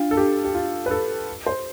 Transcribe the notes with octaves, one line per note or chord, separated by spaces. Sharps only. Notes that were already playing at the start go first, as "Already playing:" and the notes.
Already playing: D4 F4
A4
G4
G4
F4
B4
A4
C5